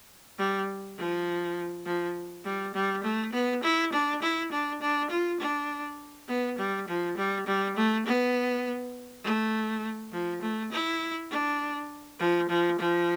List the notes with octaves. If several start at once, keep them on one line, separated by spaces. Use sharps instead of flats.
G3
F3
F3
G3
G3
A3
B3
E4
D4
E4
D4
D4
F4
D4
B3
G3
F3
G3
G3
A3
B3
A3
F3
A3
E4
D4
F3
F3
F3